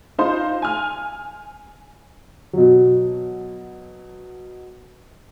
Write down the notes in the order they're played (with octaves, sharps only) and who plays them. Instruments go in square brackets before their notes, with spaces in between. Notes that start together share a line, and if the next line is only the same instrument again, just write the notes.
[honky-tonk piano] D#4 F4 C5 C6
G#5 F6
[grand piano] B2 F#3